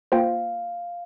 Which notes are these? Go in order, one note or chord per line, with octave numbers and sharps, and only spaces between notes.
A#3 F4 C5 F5 G5